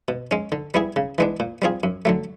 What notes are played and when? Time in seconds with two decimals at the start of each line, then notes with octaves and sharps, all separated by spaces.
0.08 B2
0.31 G#3 C#4
0.52 D3
0.74 G3 B3 E4 G#4
0.96 C#3
1.18 E3 G#3 B3 D4
1.40 A#2
1.62 G3 C4 F4 G#4
1.83 F#2
2.05 D3 F#3 A3